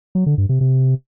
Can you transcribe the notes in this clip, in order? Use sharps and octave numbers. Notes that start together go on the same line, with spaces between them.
F#3
D3
G2
C3
C3